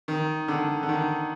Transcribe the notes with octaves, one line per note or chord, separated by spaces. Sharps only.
D#3
D3
D3
D#3